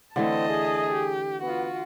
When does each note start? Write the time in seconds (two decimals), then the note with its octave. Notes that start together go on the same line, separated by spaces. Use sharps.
0.16 D3 E3 A3 C4 D#5 A5
0.49 G#4
0.93 G4
1.42 B3 F4 F#4